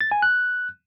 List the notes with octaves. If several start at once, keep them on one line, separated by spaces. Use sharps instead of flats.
A6
G#5
F#6